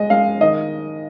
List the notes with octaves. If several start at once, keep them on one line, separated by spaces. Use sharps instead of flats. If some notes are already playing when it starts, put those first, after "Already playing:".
Already playing: G#3 D#5
G#3 F5
D#3 D#5